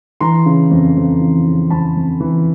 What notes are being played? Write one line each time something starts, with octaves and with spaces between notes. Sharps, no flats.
E3 A#5 C6
C#3
F2
F2
E3
C#3
F2 A5 B5
F2
E3